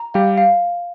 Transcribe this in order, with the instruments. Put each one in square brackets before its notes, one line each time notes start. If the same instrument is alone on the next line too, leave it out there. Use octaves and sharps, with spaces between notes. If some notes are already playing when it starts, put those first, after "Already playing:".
Already playing: [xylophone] A#5
[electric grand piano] G3 G4 [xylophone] F5
[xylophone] F5